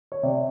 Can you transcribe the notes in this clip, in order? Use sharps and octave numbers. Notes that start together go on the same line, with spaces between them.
C#5
C3 D5